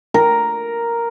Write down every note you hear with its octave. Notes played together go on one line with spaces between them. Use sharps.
A#4